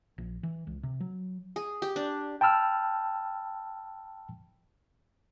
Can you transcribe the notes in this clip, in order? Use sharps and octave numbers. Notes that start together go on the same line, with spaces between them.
A#1
E3
C#2
C3
F#3
G#4
G4
D4
G5 A5 B5 E6 F6